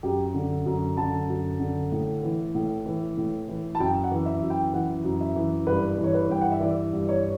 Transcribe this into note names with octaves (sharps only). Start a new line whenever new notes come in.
F#2 G4
D3
F#2
D3 A5
F#2
D3
A2
E3
A2
E3
A2
E3
A5
F#2 G5
F#5
E3
E5
F#2
G5
E3 F#5
F#2
E5
E3
G2 B4
E3
C#5
B4
G2 G5
F#5
E5
E3 D5
G2
C#5